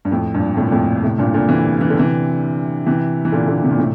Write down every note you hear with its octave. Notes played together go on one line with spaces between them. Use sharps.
G2
F2 A2
G2 A#2
A2 C3
A#2
F2 A2
A2 C3
G2 A#2
A#2 D3
C3 E3
E3
D3
C3 E3
C3 E3
E3
A#2 D3
A#2 D3
C3
A#2
A2 C3